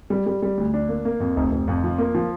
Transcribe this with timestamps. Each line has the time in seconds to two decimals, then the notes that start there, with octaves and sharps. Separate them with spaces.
0.10 G3
0.26 G3
0.42 G3
0.57 D2
0.74 D4
0.89 A#3
1.05 A#3
1.20 F2
1.36 F1
1.52 F1
1.68 F2
1.84 F3
1.98 A#3
2.15 F3